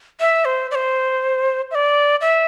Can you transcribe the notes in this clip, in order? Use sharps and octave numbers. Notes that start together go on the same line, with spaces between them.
E5
C5
D5
C5
E5
D5
E5